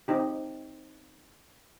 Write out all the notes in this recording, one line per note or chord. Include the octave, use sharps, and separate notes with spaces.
C4 D#4 G4